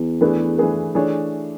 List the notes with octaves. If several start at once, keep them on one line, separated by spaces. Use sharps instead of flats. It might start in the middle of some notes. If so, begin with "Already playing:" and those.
Already playing: E2
E3 A3 D4 G#4 B4
E3 A3 D4 G#4 B4
E3 A3 D4 G#4 C#5